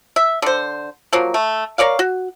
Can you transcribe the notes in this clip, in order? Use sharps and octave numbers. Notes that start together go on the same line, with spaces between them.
E5
D3 C5
F3 F#3 A#3
A3
A#4 C#5 D5 F5
F#4